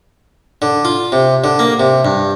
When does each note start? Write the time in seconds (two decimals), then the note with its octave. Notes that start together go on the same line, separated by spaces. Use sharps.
0.62 D3
0.85 F4
1.12 C3
1.44 D3
1.59 A#3
1.80 C3
2.05 G2